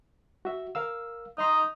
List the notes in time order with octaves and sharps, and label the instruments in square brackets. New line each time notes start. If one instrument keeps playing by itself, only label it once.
[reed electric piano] F#4 E5
A#4 F5 E6
[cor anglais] D#4 [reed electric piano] D#5 C6